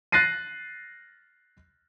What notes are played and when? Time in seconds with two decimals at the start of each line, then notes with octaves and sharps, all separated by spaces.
0.12 F#6 A6 A#6 C7 D#7